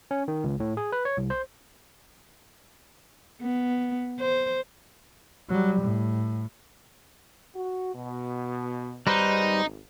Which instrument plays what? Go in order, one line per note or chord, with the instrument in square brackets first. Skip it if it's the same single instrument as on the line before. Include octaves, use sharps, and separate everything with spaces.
[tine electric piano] C#4
D#3
C#2
A2
G#4
B4
C#5
C2
C5
[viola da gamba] B3
C5
[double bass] F#3 G3
A2
[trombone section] F#4
B2
[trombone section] G#1 [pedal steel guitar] G3 B4 C5 [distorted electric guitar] D#4